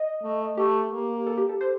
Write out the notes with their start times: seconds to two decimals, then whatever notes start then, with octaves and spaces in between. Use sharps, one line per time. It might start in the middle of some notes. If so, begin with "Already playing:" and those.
Already playing: D#5
0.22 A3
0.57 A3 G4
0.92 A#3
1.27 A4
1.38 G4
1.49 A4
1.61 C5